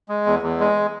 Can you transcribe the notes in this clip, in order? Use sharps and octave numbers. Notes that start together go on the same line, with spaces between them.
G#3
E2
E2
G#3